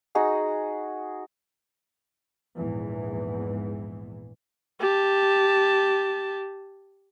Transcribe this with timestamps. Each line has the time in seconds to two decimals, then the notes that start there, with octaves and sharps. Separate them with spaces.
0.15 D#4 F#4 G#4 F#5
2.57 A#1 E2 G#2 E3
4.80 G4 A5